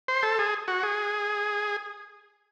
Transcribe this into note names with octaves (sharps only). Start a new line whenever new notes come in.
C5
A4
G#4
F#4
G#4